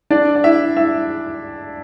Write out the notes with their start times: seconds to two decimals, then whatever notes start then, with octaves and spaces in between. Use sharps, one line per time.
0.10 D4 D5
0.35 D5
0.44 E4 E5
0.77 E4 E5